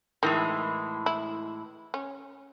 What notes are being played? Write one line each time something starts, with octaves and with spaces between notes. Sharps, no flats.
A2 D#3 E3 G#3
E4
C#4